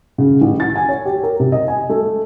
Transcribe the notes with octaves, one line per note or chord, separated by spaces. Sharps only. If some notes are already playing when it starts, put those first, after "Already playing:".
C#3
A1
A6
G#5
C#5
G4
A#4
C3
D#5
G#5
A3